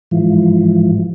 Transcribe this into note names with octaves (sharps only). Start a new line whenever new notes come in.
G#2 E3 F3